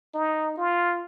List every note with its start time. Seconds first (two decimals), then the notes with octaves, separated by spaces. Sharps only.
0.14 D#4
0.57 F4